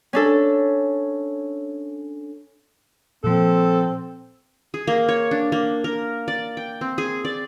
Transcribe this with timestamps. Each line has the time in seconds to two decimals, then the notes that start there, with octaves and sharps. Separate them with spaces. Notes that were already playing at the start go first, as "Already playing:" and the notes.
0.13 C#4 D4 A4
3.24 A#2 F3 C4 A4
4.74 G#4
4.87 A#3
5.09 C#5
5.31 D4
5.52 A#3
5.84 A#4
6.28 D5
6.57 G5
6.81 C4
6.98 G#4
7.25 D5